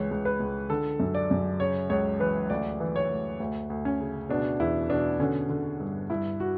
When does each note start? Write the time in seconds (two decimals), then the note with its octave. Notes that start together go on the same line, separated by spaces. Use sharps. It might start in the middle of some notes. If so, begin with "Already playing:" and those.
Already playing: C#2 E3 C#5
0.11 C#2
0.25 B4
0.40 C#2
0.70 D3 A4
1.00 F#2
1.15 D5
1.31 F#2
1.59 C#3 C#5
1.90 C#2 C#5
2.19 E3 B4
2.50 D2 D5
2.80 E3
2.96 C#5
3.09 D2
3.40 D2
3.70 D2
3.85 C#4
4.00 C#3
4.29 B2 D4
4.60 E2 E4
4.89 B2 D4
5.20 D3 C#4
5.49 D3
5.80 G2
6.10 G2 E4
6.40 F#4